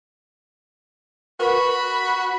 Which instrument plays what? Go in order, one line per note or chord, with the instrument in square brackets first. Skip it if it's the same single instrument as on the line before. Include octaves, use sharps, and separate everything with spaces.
[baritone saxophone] F#4 [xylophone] A#4 B4 C#6 [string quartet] B5